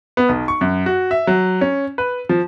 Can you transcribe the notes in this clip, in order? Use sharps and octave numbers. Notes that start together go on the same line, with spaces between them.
B3
B1
C#6
F#2
F#4
E5
F#3
C#4
B4
F3